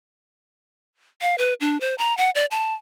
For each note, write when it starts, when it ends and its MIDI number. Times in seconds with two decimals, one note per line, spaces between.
1.21 1.36 77
1.38 1.54 71
1.60 1.80 62
1.81 1.95 72
1.98 2.16 82
2.17 2.30 78
2.35 2.45 74
2.51 2.74 81